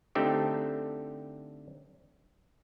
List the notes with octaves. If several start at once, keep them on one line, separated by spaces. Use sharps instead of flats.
D3 A3 C4 D#4 G4